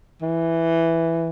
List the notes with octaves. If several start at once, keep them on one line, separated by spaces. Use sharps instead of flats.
E3